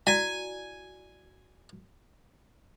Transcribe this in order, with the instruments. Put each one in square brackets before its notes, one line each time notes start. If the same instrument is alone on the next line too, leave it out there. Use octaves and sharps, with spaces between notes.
[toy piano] E4 F#4 D5 [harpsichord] G#5